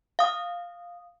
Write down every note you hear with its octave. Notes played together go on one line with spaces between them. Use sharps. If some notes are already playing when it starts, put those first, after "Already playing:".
F5 D#6